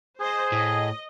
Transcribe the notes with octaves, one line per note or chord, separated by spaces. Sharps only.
G#4 C5 D#5
A2 D#5